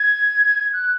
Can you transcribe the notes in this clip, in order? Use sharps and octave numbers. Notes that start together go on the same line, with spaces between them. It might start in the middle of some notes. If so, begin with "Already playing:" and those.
Already playing: G#6
F#6